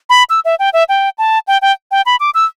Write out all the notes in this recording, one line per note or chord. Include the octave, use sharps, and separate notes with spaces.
B5
E6
E5
G5
E5
G5
A5
G5
G5
G5
B5
D6
E6